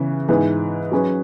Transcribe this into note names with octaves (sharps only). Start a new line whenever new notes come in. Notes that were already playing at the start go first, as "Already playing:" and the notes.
Already playing: C#3 E3 B3
G#2 E3 B3 G#4 B4
F#3 C#4 G#4 B4